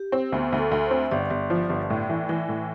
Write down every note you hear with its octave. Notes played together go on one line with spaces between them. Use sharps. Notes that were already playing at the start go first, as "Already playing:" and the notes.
Already playing: G4
C4
D2 B3
D2
A4
D2
C5
C4
E5
G1 D5
G1
F3
G1
A2
E3
E3
A2